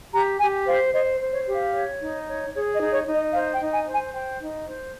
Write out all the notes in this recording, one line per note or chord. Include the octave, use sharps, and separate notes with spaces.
G4 A#5
G4 G#5
C5 F5
C5 D#5
C5
C#5
G4
F5
C#5
D#4
C#5
G#4 C#5
D#5
D#4
C#5
D#4
D#5
C5 F5
G5
D#4
G#5
C5
G#5
C5 G5
D#4
C5